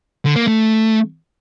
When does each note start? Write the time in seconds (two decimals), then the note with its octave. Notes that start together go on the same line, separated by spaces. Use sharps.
0.25 D3
0.36 A#3
0.47 A3